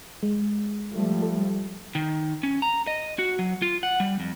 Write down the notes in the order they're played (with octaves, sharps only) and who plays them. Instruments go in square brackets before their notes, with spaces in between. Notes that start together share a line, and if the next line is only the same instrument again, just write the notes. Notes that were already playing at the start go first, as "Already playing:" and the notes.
[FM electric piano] G#3
[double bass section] F3 G3 A3
[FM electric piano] A4
[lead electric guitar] D#3
C#4
A#5
D#5
F#4
F#3
F4
F#5
G3
F2